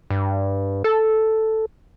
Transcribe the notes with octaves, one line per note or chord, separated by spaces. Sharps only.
G2
A4